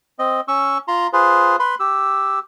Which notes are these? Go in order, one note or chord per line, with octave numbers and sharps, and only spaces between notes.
C4 D#5
C#4 C#6 E6
F4 A#5 C6
F4 G#4 B4 C5
B4 B5 C6
G4 E6